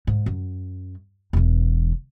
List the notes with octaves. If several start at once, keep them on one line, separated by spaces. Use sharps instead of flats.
G#2
F#2
E1 E3